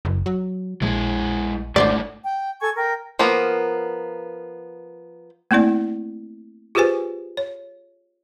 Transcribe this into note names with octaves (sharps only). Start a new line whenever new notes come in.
F#1
F#3
A#1 G#3 E4
G#1 G#2 D3 A3 C5 D5
G5
A4 G#5 C#6 G#6
A#4 G5
F3 A#3 B3 A#4
A3 A#3 C4 E4 D5
F4 G4 G#4 B4 C5 G#5
C#5